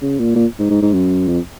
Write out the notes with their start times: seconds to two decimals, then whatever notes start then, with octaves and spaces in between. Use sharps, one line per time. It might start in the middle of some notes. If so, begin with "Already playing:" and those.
0.02 C#3
0.19 A#2
0.35 A#2
0.59 G#2
0.70 G#2
0.82 G#2
0.93 F#2
1.28 F2